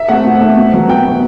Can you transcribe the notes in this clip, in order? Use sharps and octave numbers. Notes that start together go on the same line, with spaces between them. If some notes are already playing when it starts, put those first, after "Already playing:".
Already playing: E5
A3 C4 F#5
B2
A3 C4
B2
F#3 B3
B2 G5
F#3 B3